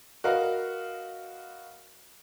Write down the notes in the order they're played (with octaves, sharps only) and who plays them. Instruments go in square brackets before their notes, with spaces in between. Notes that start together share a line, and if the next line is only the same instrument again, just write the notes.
[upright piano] F#4 A#4 B4 D#5 F5